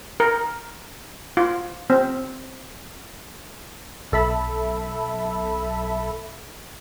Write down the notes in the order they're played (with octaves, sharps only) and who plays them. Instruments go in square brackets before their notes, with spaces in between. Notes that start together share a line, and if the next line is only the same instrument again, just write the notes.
[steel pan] A#4
F4
C4
[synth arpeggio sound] B1 A4 E5 B5